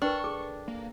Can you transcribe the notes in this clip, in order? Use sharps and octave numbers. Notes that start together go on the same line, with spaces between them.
D4 A#4 B4 G5 C#6
G#4 A4 D6
A#3